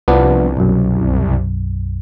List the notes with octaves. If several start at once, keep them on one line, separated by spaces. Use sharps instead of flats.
C2 F3 B3 D4
B1 F#2